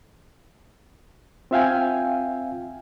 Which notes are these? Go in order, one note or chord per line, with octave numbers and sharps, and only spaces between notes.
C4 F4 E5 F5 G5 G#5